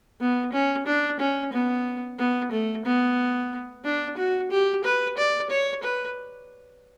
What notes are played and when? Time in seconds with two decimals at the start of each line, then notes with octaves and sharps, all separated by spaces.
0.20 B3
0.53 C#4
0.86 D4
1.20 C#4
1.53 B3
2.19 B3
2.52 A3
2.85 B3
3.85 D4
4.17 F#4
4.51 G4
4.84 B4
5.17 D5
5.50 C#5
5.83 B4